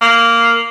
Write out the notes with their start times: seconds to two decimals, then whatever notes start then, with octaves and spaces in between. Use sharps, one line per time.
0.01 A#3